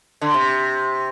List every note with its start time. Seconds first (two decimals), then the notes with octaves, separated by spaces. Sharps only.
0.21 D3
0.34 C3